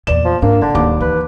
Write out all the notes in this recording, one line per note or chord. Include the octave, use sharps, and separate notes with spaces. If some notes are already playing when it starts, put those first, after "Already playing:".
E2 A#2 D5 E7
F3
G#2 A#3 D4
F1 D3
D1 D#2 D6
E3 B4